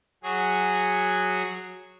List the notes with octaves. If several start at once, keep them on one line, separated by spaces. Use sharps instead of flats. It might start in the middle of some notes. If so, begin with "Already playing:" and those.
F#3 F#4 G#4